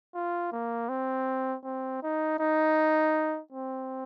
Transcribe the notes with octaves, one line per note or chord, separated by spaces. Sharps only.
F4
A#3
C4
C4
D#4
D#4
C4